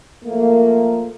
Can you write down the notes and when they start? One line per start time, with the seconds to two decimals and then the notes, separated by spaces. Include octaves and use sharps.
0.25 F3 A3 A#3